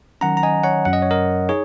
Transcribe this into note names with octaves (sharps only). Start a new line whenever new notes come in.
D#3 F#3 C#4 F#5 A#5
A#5
D#5 G#5
C#5 F#5
F#2 F#3 C#4 F#5
D#5
C#5
A#4 D#5
D#4 G#4 C#5